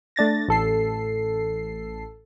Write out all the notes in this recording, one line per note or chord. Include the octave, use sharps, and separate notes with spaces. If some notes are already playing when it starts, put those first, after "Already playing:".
A3 D4 A6 A#6
A1 A4 C7